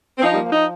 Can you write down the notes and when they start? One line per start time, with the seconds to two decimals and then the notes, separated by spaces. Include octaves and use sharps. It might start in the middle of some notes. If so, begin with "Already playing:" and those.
0.18 C4
0.22 F3 D#4
0.33 G3
0.36 A#3
0.44 F3
0.52 D#4